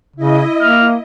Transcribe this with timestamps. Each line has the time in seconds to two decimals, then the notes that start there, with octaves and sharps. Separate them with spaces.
0.16 C#3 E4 D#5
0.61 A#3 F6